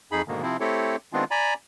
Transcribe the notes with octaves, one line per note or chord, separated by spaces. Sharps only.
F2 D#4 G#4 B5
G#2 B2 D3 D#3 A#3
C3 F3 C4 E4
A3 C4 E4 G4 A4 C#5
D#3 G#3 B3 C4 D4 F4
D5 G#5 A#5 B5